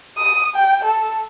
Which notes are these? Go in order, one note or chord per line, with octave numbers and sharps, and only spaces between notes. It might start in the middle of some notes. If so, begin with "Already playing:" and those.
D#6
G5
A4